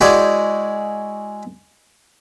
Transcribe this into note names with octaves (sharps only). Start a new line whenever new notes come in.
G#3 E4 F#4 G#4 D5 G5